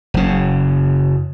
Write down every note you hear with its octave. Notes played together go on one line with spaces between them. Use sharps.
F#1 C#3